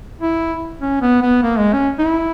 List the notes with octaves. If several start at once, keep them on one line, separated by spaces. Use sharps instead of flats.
E4
C#4
B3
B3
A#3
G#3
C#4
D#4
E4